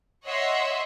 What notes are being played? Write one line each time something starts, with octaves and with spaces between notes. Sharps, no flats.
C#5 D#5 E5 F#5 C6